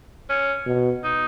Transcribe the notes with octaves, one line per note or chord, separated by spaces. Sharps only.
C#4
B2
D#4